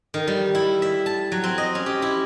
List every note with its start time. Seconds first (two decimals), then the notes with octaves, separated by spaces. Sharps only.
0.14 D#3
0.28 G3
0.55 E4
0.82 E5
1.06 A5
1.32 F#3
1.44 C4
1.58 D#5
1.75 C#4
1.86 G4
2.02 E4